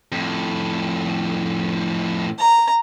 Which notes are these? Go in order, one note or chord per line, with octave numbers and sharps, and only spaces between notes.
F2 A2
A#5